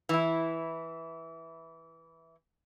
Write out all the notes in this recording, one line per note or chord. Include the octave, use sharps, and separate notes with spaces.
E3 E4